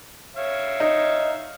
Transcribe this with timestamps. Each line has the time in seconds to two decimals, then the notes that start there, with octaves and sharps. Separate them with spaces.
0.36 C#5 E5 F5
0.80 D#4